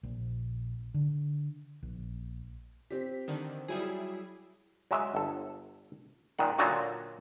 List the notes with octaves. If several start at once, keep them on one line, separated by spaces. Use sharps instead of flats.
A#1
D3
A#1
C4 G4 B6
D3 D#3
F#3 G3 E4 G#4
F#3 G#3 E5
G1 A4
A#2 D#3 F#5
A#2 D3 F#3 D#4 F4 F#4